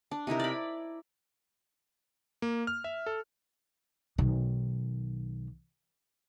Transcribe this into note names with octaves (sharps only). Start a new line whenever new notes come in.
D4
C3 D#4 E4 A#4
D5 B5
A#3
F6
E5
A4
B1 D#3